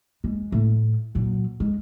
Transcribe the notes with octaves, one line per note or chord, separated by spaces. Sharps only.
G#3
A2
A#2 F#3
G#3